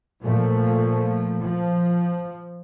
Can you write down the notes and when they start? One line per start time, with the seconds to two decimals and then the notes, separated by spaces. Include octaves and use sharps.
0.22 A#2 F3 A3
1.42 F3